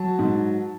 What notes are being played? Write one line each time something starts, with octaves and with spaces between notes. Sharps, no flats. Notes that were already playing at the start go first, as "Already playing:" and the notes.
Already playing: F#3 A5
G#2